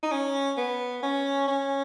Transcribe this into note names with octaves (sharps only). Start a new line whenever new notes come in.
D#4
C#4
B3
C#4
C#4